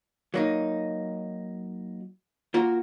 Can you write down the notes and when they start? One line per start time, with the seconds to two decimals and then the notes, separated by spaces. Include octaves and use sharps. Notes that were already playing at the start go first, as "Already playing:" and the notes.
0.34 F#3 A#3 D#4
2.54 A#3 F4 F#4 A#4